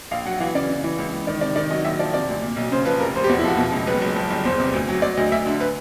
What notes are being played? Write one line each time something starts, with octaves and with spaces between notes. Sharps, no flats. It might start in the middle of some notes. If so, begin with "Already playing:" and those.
A#1 F5
F#3 F#5
E3 F5
C#3 D5
C#3
E3
C#2
C#2
D#3 D5
C3 D5
D#3 D5
F#3 D#5
A#1 E5
F3 D5
C3 D5
D2
A#2
B1
C#3 C5
F3 B4
F1 A#4
F1 C5
G4
E2 F#4
E4
F3 F#4
B2
C#2
F#1 B4
F#1
F3
G1
E2 C5
C3
D2
F#3
F#3 D5
D2 D#5
D2 E5
D3
B4